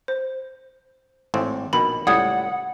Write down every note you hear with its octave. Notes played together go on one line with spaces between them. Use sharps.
C5
G#1 A2 C4
A#1 B2 D#3 B5
C#2 A2 G3 D5 F#5 D#6 G#6